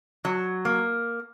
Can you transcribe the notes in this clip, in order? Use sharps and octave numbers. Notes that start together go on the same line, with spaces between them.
F#3
A#3